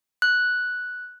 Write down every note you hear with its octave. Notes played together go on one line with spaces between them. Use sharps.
F#6